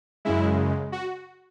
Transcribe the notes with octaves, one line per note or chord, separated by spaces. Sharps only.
F#2 C#3 G#3 E4
F#4